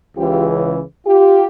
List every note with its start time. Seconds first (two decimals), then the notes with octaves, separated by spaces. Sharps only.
0.16 C#2 C#3 E3 F4 G4
1.07 F4 G4